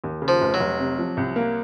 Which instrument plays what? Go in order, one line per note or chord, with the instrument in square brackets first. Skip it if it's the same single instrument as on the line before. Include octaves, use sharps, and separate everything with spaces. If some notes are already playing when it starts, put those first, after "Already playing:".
[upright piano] D#2
C#3
[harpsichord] F3
[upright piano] F1
[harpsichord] F#3
[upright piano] F1
C3
F3
C2
A#3